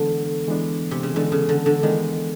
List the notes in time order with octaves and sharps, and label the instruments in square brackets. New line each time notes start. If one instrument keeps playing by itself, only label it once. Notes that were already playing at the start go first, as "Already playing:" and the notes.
Already playing: [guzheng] D3 [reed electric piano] E3 G#3 B3 D4
[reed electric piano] E3 G#3 B3 D4
[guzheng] C3
C#3
[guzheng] D3 [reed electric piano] E3 G#3 B3 D4
[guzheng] C#3
D3
D3
[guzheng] D#3 [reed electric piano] E3 G#3 B3 D4